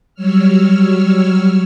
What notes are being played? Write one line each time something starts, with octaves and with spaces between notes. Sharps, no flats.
F#3 G3 C#5 E6 F6